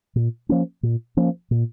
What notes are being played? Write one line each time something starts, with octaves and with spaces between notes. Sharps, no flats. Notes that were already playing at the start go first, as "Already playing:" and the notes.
A#2
F3 A#3 C#4
A#2
F3 A#3 C#4
A#2